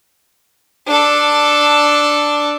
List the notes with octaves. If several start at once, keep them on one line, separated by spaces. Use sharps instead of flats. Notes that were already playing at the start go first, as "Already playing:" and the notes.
D4 A4